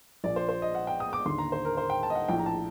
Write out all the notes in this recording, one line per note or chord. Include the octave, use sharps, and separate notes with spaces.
A#1 A#2 D5
C5
C5
D#5
F#5
G5
D#6
D6
D#2 D3 C6
A#5
C5
A#4
C5
G5
A5
D#5
F#5
A#1 A2 G5
A#5
A5